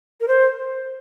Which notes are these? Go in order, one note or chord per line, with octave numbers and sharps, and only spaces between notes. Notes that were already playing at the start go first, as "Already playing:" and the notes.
A#4
C5